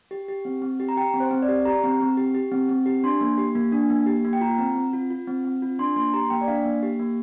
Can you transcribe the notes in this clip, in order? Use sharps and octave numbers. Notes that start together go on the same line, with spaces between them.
G4
G4
C4
C4
G4
A#5
G4 G5
C4
C5
C4
D5
G4
G4 A#5
C4
C4
G4
G4
C4
C4
G4
D4 C6
A#3
G4
A#3
D4
A#3
G4
A#3
G5
F4 A#5
C4
C4
F4
F4
C4
C4
F4
D4 C6
A#3 C6
G4 A#5
A#3 G5
D5
D4 F5
A#3
G4
A#3